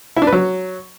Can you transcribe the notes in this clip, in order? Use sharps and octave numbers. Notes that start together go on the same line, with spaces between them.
E4
D4
B4
F#3